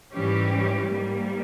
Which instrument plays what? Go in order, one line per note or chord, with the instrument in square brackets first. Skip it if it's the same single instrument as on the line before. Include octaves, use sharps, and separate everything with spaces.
[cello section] G#2 E3 G3 C#4 G4
G#2 G3 A#3